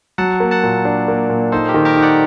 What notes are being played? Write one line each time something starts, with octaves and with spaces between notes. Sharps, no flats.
F#3 F#5 A5
A#3
F#5 A5
A#2
D4
A#3
A#2
D#4 A4 C5
G4 A#4
D#3
G4 A#4
D#4
D5 F#5